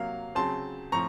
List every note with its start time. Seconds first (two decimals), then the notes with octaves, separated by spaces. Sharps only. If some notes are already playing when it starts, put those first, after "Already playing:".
Already playing: C3 F#3 A#3 F5
0.35 C#3 F#3 C4 A5 C6
0.92 A2 F3 C4 A#5 C#6